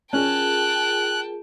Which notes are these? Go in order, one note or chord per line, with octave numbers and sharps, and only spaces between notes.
C#4 F4 G#4 A#4 G5 A5 F#6